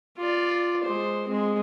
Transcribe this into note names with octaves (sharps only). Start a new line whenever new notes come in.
F4 D5
G#3 C5
G#3 C4